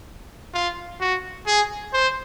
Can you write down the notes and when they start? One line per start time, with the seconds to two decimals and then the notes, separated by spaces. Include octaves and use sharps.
0.54 F4
1.01 F#4
1.47 G#4
1.93 C5